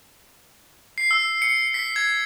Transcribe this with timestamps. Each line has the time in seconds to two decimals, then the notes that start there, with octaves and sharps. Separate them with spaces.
0.98 C7
1.11 E6
1.42 C#7
1.74 B6
1.96 G#6